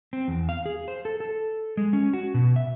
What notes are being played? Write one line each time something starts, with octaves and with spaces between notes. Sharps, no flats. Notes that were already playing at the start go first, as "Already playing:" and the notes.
C4
E2
F5
G#4
C5
A4
A4
G#3
C#4
F#4
B2
E5